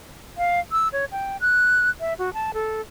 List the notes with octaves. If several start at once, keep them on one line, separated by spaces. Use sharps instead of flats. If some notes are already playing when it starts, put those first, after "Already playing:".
F5
E6
C#5
G5
F#6
E5
F#4
A5
A4